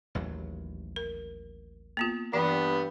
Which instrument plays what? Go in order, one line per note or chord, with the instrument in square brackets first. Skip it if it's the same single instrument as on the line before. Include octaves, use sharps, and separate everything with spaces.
[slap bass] A1 D#2 F#3
[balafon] A#4
A#3 B3 F4
[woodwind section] G2 [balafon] E3 [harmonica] B3 B4